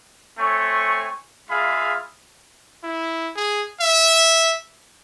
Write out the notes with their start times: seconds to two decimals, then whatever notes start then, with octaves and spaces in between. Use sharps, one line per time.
0.39 A3 C4 C#5 G#5 C#6
1.50 G#3 F4 G#4 E5 F5 B5
2.84 E4
3.36 G#4
3.81 E5